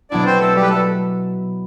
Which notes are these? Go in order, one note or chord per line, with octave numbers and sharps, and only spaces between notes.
B2 F#3 B3 D4 E4 D5
C4 C5
A3 A4
G3 G4
B4
A3 A4